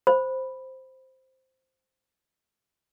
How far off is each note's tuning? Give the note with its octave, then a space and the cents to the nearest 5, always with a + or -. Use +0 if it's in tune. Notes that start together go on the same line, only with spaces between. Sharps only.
C5 +0 B5 +0